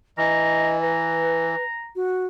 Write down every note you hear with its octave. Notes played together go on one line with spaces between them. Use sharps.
E3 D#5 A#5
B4 A#5
F#4